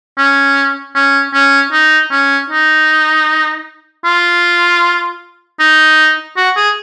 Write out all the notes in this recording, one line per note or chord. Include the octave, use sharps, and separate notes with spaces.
C#4
C#4
C#4
D#4
C#4
D#4
F4
D#4
F#4
G#4